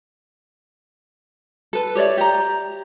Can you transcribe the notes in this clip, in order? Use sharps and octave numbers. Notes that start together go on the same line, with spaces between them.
A4 B4
G4 C#5 D5 E5
G4 A#5